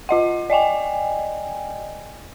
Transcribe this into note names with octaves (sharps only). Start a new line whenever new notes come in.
F4 D#5 F#5
D5 D#5 G5 G#5